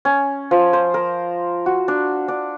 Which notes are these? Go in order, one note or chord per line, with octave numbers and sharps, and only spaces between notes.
C#4
F3
C5
A#4
F#4
D4
D4